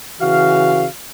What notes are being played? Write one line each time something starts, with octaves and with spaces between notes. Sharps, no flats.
C#3 E3 F#4 F5